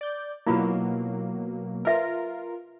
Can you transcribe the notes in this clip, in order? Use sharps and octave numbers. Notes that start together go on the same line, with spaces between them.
D5 G6
B2 F#3 A#3 E4 F4 B5
F4 A#4 B4 E5